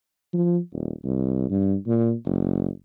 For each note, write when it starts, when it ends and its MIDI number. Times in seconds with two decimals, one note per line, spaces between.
0.33 0.58 53
0.72 0.92 27
1.04 1.47 36
1.50 1.75 43
1.87 2.13 46
2.25 2.68 30